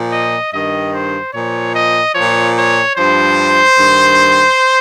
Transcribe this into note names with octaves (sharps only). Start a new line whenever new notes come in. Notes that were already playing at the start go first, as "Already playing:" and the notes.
Already playing: A#2 F3
D#5
G2 D#3 D#5
C5
A#2 F3 C#5
D#5
A#2 F3 C#5
C#5
G2 F3 C5
G2 D#3